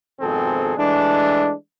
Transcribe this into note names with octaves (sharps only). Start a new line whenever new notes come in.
G#1 F2 B2 C4 G#4 A4
E3 G#3 A3 D4